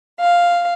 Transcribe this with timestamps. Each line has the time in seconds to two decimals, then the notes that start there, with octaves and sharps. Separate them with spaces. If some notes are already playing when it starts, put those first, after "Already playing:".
0.19 F5